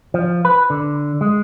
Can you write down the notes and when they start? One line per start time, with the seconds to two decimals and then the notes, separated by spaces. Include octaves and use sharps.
0.14 F3
0.45 B4
0.70 D3
1.21 G#3